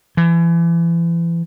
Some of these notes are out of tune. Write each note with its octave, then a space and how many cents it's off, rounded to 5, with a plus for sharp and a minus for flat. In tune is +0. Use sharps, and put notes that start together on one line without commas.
E3 +35